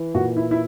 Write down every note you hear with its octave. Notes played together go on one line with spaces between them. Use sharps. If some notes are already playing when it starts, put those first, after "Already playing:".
Already playing: E3
A#2 F#4
E4
E4